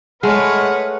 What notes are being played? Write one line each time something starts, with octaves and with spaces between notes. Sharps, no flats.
G#3 A3 B4 C#5 D#5 F#5 F6